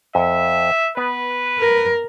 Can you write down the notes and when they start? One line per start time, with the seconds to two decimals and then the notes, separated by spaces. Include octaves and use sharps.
0.15 F2 E5
0.97 B3 B4
1.59 A#4